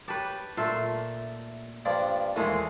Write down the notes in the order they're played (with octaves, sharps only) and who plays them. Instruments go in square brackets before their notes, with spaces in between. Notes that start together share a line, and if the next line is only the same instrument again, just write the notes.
[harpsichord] G4 A5 D6 [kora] B4 C#5
[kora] A#2 A3 [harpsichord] E5 A5 C6
[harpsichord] G2 F3 D5
[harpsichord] D#2 G#3 C6 [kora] E3 A3